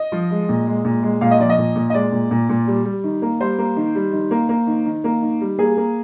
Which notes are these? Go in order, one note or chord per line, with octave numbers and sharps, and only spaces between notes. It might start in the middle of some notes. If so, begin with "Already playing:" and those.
Already playing: D#5
F3
G#3
A#2
G#3
A#2
G#3
A#2 F5
D#5
F3 D5
D#5
A#2
A#2
D#5
G#3 D5
A#2
A#2
A#2
G3
G3
D#3
A#3
G3 C5
A#3
D#3
G3
D#3
A#3
A#3
D#3
D#3
A#3
D#3
G3
A#3 G#4
A#3